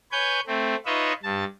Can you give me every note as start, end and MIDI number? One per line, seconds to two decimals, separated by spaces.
0.12 0.40 71
0.12 0.40 73
0.12 0.40 80
0.12 0.40 91
0.47 0.75 57
0.47 0.75 60
0.86 1.13 63
0.86 1.13 65
0.86 1.13 71
0.86 1.13 73
0.86 1.13 75
0.86 1.13 76
1.23 1.44 43
1.23 1.44 81